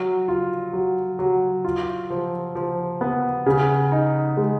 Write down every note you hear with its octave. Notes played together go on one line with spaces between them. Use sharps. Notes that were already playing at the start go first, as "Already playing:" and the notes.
Already playing: F#3
F4
F#3
F#3
F4
F3
F3
B3
C#3
D#4
G#3